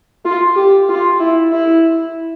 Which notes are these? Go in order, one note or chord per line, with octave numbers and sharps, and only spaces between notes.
F4
G4
F4
E4
E4